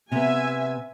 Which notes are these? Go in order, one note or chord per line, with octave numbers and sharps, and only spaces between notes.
C3 B3 E5 G#5